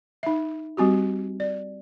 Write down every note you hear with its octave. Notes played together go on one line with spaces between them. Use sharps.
D#4 E5
G3 C4 F#4 G4
D5